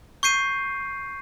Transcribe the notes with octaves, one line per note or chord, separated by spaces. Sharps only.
C#6 G6 C7 D#7